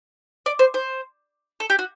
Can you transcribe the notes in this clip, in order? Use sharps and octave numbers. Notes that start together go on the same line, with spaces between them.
D5
C5
C5
A4
G4
F#4